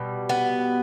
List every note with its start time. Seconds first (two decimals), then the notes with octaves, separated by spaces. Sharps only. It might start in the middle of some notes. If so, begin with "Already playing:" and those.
Already playing: B2 G3
0.29 B3